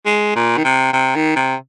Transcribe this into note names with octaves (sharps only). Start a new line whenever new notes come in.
G#3
A#2
D#3
C3
C3
D#3
C3